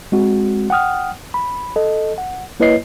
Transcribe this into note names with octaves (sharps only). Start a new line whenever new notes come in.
G#3 C4 F#4
F#5 G5 D#6 F6
B5
A4 D#5
F#5
A#3 E4 B4 C#5 D#5 C7